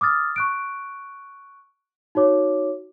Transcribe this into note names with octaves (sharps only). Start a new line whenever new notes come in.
D6 D#6 F6 A6
C#6 F#6 D7
D#4 F#4 C#5 D6